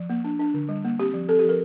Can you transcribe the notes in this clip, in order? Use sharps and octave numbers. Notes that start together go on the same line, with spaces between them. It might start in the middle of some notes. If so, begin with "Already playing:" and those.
Already playing: F3
A#3
D4
D4
D3
G3
A#3
C4 G4
F3
C4 A4
G4
F3 A#4